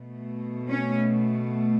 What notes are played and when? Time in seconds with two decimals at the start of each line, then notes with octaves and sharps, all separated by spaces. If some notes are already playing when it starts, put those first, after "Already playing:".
Already playing: B2 A3
0.70 C#4